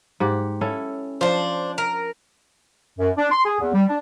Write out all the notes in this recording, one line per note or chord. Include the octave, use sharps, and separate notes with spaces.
G#2 G4 F#5
C#4 E4 A4
F3 D4 C5
A#4
F#2
D4
C6
G#4
E2
G3
D4